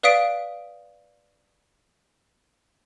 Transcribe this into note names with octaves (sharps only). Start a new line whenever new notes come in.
B4 D5 F5 D#6 B6 D7